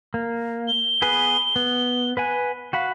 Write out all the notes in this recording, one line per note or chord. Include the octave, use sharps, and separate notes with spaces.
A#3
G7
B3 G#4 B4
B3
B4 F#5 G#5
F#4 F5 F#5 B5